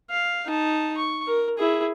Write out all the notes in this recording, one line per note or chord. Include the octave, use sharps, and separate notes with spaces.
F5
D#4 A5
C#6
A#4
E4 G#4